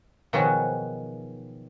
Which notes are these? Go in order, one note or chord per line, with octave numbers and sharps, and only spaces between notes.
B2 D#3 F3 F#3 F#4 G#4